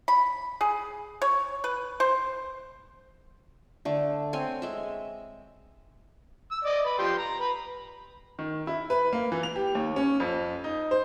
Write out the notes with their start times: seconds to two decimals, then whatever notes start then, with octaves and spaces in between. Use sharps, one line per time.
0.08 B5
0.61 G#4
1.22 C#5
1.64 B4
2.00 C5
3.85 D3 A3
4.33 C4 C#5 G#5
4.62 G#3 E5
6.51 E6
6.65 D5 D#5
6.85 B4
6.99 F3 G4 C6
7.18 A#5
7.41 B4
8.39 D#3
8.67 E4
8.90 B4
9.13 A#3
9.32 E3
9.43 F7
9.56 G4
9.75 D#2
9.96 C#4
10.20 F2
10.64 D#4
10.91 C5